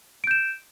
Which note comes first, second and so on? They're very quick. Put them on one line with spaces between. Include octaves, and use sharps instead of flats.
D7 G6 E7